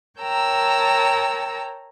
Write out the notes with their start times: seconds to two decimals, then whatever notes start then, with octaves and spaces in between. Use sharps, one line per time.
0.18 A#4 C#5 G5 A5 A#5 E6